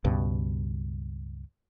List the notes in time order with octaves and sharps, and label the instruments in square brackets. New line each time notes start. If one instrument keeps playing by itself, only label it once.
[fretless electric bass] C#2 G2 B2